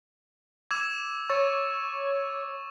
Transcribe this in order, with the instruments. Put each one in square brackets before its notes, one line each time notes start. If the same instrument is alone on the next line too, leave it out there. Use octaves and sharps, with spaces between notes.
[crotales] D6 E6 E7 [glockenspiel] G#6
[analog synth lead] C#5 [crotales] C#6 [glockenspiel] E6 A6